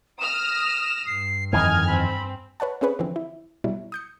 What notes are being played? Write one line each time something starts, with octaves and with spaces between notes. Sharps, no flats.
D#6 F6 A#6 E7
G2 C7
F2 D#3 E3 D#5 G#5 F6 G#6
C4 B5
B4 C#5 F#5 A5
C4 C#4 G#4 B4 C#5
D3 E3 F3 C4
E4
B2 F#3 G3 E4
D#6 G6 C#7